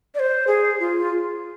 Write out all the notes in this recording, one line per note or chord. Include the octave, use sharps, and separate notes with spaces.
D5
C5
G#4
F4